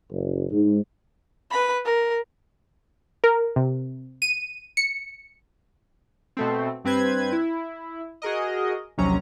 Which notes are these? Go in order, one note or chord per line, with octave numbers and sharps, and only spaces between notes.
F#1
G#2
B4 B5
A#4
A#4
C3
D#7
C#7
B2 A3 C4
G2 C4 B4 G#6
E4
F#4 G#4 A#4 D#5
A#1 D#2 C3 F#3 C#4 A#5